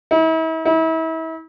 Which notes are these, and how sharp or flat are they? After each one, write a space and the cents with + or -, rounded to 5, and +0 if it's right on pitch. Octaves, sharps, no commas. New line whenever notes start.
E4 -40
E4 -35